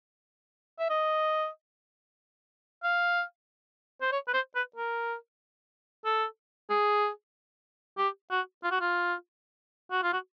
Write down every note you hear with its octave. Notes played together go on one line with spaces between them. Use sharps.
E5
D#5
F5
C5
C#5
B4
C5
B4
A#4
A4
G#4
G4
F#4
F4
F#4
F4
F#4
F4
F#4